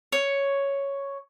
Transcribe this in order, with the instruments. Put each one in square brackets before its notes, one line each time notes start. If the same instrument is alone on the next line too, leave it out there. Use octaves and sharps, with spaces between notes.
[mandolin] C#5